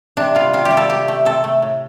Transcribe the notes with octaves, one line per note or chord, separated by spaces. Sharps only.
C3 D4
G3 F4
C3 F4
G4
G3
A4
C3 G4
A3
C3 A4
A3
A2